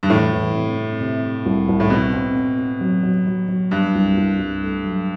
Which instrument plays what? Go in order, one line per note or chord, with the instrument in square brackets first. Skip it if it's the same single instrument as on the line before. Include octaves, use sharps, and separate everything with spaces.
[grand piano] G2
[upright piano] E2 [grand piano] A2
[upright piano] E2
C3
C3
C3
C3
C2
C2
[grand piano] A2
[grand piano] B2 [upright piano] C4
[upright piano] C4
C4
C4
F#3
F#3
F#3
F#3
[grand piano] G2 [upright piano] G3
[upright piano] C2
C2
C2
A3
F#3